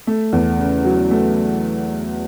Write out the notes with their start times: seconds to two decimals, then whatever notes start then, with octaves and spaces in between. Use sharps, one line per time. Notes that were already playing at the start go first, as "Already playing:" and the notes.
0.07 A3
0.33 E2
0.59 C#3
0.84 F#3
1.11 A3